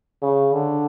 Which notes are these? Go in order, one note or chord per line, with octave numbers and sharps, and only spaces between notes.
C#3
D3